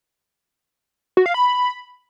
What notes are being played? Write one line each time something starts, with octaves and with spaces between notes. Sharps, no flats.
F#4
F5
B5